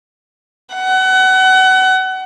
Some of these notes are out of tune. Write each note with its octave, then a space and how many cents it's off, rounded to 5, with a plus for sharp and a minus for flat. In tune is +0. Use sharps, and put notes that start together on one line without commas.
F#5 +30